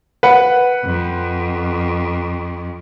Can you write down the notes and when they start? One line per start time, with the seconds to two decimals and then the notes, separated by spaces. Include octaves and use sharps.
0.23 B4 F#5
0.85 F2